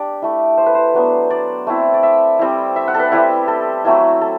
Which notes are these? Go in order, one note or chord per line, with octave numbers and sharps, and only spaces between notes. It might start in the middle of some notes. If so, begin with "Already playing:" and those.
Already playing: D4 G4 D5
A3 E4
C5
B4
C5
F#3 B3 D4
D5
A3 C4 E4
D5
E5
G3 C4 E4
E5
F#5
A4
B4
G3 C4 E4 G4
A4
F#3 A3 C4 E4
A4